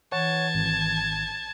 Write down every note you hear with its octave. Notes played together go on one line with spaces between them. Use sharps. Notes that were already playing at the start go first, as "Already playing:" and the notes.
E3 C#5 F#5 A5 G#6
G#1